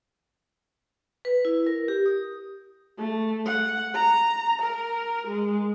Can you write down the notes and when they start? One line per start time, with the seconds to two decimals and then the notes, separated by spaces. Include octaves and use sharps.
1.25 B4
1.45 E4
1.67 A#4
1.88 G4
2.06 D#6
2.98 A3
3.46 F#5
3.94 A#5
4.62 A#4
5.27 G#3